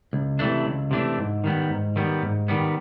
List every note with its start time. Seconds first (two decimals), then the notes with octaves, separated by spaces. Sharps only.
0.13 C#2
0.39 C3 E3 A3 D4
0.65 C#2
0.91 C3 E3 A3 D4
1.18 G#2
1.44 D#3 G3 B3
1.69 G#2
1.96 D#3 G3 B3
2.22 G#2
2.48 D#3 G3 B3